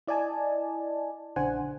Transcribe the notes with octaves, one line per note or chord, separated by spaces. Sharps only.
E4 D5 D#5 G#5 A5
A#1 C#3 D4 C5 F#5 G#5